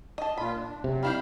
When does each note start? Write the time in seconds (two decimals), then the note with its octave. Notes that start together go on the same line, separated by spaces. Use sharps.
0.18 D#5 A5
0.38 A#2 F4 B5
0.57 D4
0.84 C3 F#3
1.03 G3 E4 G4 F5 B5 F6